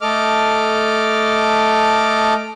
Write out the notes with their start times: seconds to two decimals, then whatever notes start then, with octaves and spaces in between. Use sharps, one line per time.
0.01 A3 A4 D#5 D6 F6